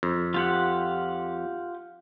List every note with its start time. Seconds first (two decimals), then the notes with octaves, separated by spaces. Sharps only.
0.03 F2
0.34 F4 G4 F#5